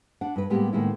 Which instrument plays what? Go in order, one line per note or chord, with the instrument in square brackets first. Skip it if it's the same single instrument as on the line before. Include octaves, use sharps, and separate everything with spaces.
[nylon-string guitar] D4 F#5
G2 B4
A2 G3 G#3 A#3 B3 G4
A2 D#3 G#3 A#3 B3 E4